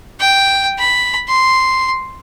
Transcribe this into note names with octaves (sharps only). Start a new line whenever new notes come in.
G5
B5
C6